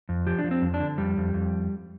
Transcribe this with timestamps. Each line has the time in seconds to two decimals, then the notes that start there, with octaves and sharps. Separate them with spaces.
0.09 F2
0.27 F3 G4
0.38 D4
0.44 F3
0.51 C4
0.62 F2
0.74 D4
0.80 D3
0.98 F2 G3
1.17 F2
1.34 F2